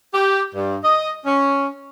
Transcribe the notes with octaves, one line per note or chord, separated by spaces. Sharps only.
G4
G2
D#5
C#4